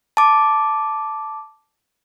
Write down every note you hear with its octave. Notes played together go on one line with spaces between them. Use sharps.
A5 D6